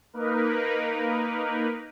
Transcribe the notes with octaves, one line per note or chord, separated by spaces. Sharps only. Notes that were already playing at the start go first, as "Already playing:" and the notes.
A#3 D#4 A#4 B4